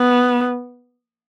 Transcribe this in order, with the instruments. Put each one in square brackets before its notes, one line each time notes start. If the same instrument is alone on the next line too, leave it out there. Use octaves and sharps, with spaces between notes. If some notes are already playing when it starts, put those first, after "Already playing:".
Already playing: [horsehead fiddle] B3